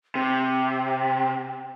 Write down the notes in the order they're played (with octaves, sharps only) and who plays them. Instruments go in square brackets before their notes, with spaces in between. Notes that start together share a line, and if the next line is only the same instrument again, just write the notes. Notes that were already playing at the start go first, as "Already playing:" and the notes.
[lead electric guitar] C3 [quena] G5